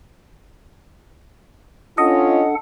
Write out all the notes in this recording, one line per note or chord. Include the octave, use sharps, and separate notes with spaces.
C#4 D4 F4 A4 D#5 F#5